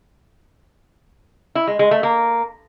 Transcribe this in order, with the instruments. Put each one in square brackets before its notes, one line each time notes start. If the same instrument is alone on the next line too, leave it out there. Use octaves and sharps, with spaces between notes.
[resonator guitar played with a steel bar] E4
G#3
G#3
A3
A#3